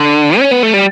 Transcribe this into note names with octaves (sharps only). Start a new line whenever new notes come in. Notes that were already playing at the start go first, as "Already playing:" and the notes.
Already playing: D3
C#4
B3
A3
G3